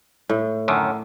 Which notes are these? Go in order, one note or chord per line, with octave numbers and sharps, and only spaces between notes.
A2
F#2 D3 D#3